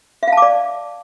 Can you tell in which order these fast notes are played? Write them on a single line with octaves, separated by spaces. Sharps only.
E5 F5 A5 D6 D5